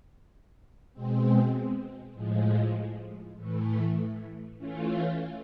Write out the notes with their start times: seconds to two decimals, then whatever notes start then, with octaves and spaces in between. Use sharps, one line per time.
0.93 B2 G#3 C4
2.14 A2 F3 G#3
3.37 A2 E3 A3
4.58 E3 A3 C#4 F4